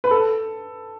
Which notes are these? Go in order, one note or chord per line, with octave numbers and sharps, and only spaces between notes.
B4
A4